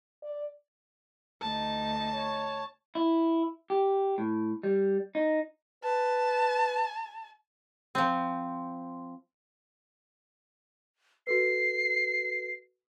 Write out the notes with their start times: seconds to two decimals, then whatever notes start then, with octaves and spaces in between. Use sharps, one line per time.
0.23 D5
1.41 D2 D#4 A5
2.13 C#5
2.95 E4
3.70 G4
4.18 A2
4.63 G3
5.15 D#4
5.84 B4 A5
7.95 F3 C4
11.27 F#4 A4 B4 C7